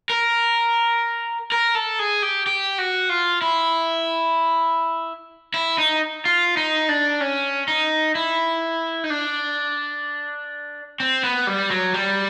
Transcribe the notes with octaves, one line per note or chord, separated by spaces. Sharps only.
A#4
A#4
A4
G#4
G4
G4
F#4
F4
E4
E4
D#4
F4
D#4
D4
C#4
D#4
E4
D#4
D4
C4
B3
G3
F#3
G3